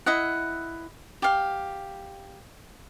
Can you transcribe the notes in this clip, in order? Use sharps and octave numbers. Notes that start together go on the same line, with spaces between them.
E4 D#5 F#5
G4 F5